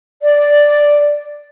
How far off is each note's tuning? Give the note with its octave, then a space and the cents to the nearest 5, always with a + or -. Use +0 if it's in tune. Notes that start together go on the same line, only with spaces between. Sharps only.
D5 +0